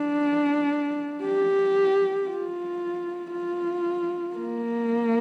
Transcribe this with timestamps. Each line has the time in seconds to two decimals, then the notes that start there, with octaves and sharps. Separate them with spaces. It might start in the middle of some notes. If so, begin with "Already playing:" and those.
Already playing: D4
1.23 G4
2.27 F4
3.32 F4
4.36 A#3